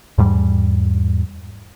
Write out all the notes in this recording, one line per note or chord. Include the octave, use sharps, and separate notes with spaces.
E2 G#2 G3